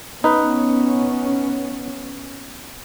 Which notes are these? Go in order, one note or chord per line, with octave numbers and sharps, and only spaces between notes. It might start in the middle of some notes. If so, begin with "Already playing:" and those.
B3 C#4 D#4 B4